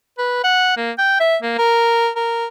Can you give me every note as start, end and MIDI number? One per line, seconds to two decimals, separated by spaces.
0.18 0.43 71
0.44 0.76 78
0.77 0.91 58
0.98 1.18 79
1.20 1.36 76
1.42 1.56 58
1.58 2.09 70
2.16 2.46 70